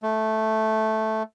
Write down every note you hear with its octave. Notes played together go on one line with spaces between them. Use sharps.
A3